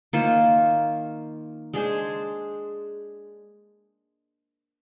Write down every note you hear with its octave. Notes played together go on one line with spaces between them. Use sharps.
D#3 A#3 F4 C5
G#3 D4 G#4 C5